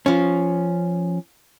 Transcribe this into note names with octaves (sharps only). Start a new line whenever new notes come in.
F3 C#4